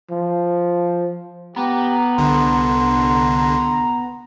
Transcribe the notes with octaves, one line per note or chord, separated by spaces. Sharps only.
F3
B3 G4 A#5
C2 D3 C6